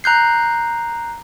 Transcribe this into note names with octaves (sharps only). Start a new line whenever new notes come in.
A#5 F#6 G6 C7